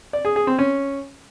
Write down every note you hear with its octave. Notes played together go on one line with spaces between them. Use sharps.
D5
G#4
G#4
C4
C#4